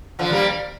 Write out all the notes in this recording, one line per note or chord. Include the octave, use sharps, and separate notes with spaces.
D3 F3
G3 A#3